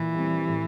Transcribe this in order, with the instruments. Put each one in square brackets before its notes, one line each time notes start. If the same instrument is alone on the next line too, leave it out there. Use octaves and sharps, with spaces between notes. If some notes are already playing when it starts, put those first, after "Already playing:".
Already playing: [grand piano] A#2 [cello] E3
[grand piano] G3 C4 G4
A2